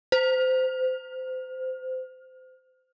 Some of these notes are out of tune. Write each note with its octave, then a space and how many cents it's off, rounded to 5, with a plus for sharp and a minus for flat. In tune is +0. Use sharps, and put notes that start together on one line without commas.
C5 -25